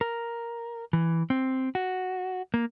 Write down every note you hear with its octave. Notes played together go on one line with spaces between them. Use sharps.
A#4
E3
C4
F#4
A#3